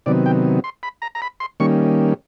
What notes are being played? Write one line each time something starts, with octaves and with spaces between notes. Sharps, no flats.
C3 D#3 F#3 B3 D5
G5
C6
B5
A#5
A#5
B5
C6
D#3 G3 A#3 C#4 C#6